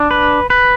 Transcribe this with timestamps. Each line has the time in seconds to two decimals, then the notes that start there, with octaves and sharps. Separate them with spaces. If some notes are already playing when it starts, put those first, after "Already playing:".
Already playing: D4
0.11 B4
0.50 B4